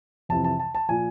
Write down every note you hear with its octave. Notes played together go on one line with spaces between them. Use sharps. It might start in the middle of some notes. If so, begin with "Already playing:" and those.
F2 C3 E3 A5
A5
A5
A5
A#2 F3 G#5